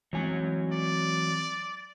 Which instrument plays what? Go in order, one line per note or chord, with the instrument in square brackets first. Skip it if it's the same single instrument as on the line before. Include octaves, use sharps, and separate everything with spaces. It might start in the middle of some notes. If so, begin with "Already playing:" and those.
[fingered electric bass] E3 G#3 C4 [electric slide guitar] F#3 C#5 G#5
[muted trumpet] D5